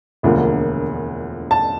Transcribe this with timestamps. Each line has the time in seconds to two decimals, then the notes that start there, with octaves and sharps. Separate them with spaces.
0.23 E1 D2 D3 F3 A#3
1.51 A5